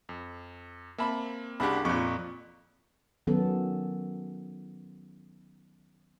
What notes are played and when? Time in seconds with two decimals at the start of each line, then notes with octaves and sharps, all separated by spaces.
0.09 F2
0.98 A#3 C4 E5 A5 B5
1.60 C2 C#3 D4 G4 F#5 B5
1.85 F2 A#2 B5 C#6 D6
3.27 D#3 F#3 B3 C#4 A4